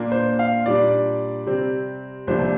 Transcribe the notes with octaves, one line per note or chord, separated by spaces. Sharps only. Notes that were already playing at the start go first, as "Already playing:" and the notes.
Already playing: A#2 A#3 D4
C5
F5
A#2 G3 D4 D5
C3 G3 C4
C2 C3 F3 A#3 D4 C5